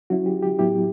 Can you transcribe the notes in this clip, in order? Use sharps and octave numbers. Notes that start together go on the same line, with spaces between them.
F#3 C#4 E4 F#4
G4
G4
A2 F#3 B3 E4 G4